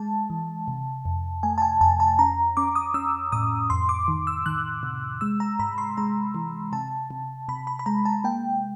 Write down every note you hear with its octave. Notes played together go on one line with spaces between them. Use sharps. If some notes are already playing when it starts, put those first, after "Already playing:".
Already playing: G#3 A5
E3
C3
F2
A3 G#5
A5
G#5
F2 A5
A5
C#4 A#5
C#4 D6
D#6
C#4 E6
A2 D#6
F2 C6
D6
D#3
E6
D#3 F#6
C3
G#3 E6
A#5
G#2 B5
C6
G#3 A#5
E3
C3 A5
C3
C3 B5
B5
B5
G#3 A#5
A5
A#3 G5